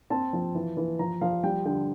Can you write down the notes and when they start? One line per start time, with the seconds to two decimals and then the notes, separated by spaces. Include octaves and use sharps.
0.10 C4 A5
0.33 F3
0.55 E3
0.77 E3
0.99 F3 A#5
1.21 F3 F5
1.43 G3 G5
1.65 D3 G5